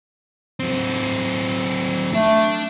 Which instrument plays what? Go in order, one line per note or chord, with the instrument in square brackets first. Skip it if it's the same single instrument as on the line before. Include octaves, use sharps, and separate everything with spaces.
[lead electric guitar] F#3 C4
[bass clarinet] A3 [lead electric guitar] D4 A5